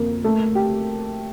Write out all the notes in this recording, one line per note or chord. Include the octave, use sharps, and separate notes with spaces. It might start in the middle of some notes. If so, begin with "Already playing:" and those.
Already playing: F2 A#3
A3
G4